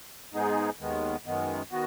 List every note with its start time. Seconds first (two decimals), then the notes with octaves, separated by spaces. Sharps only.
0.34 G#2 G#3 B3 D#4 G#4
0.79 D#2 D#3 G#3 B3
1.26 F#2 D#3 G#3 B3
1.71 D#3 B3 F#4